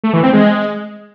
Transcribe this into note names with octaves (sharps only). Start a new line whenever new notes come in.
A3
E3
C4
G#3